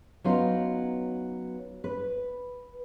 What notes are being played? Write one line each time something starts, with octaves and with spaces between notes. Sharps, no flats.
F#3 B3 C#4 D#4 F4
B4